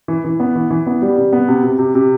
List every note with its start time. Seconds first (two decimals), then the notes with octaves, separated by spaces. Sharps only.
0.08 E3
0.25 E3
0.40 B3
0.55 E3
0.70 E3
0.87 B3
1.02 G3
1.17 C3
1.33 B3
1.48 C3
1.63 C3
1.79 C3
1.95 C3